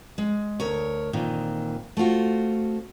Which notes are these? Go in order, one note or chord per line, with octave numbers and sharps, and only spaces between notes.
G#3
D2 A#4 C#5
F2 A#2 D#3 E3
A3 C4 F4 F#4